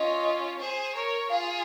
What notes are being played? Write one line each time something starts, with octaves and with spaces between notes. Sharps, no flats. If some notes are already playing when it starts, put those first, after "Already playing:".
Already playing: C#4 F4 D#5
G#4 C5
A#4 C#5
F4 G#4 F5